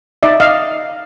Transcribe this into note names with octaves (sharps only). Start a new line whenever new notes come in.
D#4 D5 E5
D#5 F5